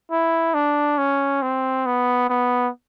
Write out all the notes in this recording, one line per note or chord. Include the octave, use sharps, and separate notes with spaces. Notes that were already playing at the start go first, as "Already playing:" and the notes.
E4
D4
C#4
C4
B3
B3